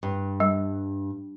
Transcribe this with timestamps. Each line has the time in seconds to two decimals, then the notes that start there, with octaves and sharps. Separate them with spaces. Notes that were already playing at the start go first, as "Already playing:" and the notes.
0.03 G2
0.40 G3